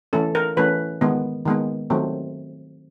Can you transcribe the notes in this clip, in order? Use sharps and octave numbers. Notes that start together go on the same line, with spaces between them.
E3 A3 C#4 A4
A#4
E3 A3 C#4 B4
D#3 G#3 B3
D#3 G#3 B3
D#3 F#3 A3 C4